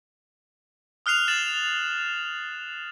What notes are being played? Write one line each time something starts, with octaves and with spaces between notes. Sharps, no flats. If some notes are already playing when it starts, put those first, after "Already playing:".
D#6 F6 F#6 C7 F7
A6 E7 F#7